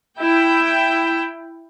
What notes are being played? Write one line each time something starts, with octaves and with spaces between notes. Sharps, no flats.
E4 G5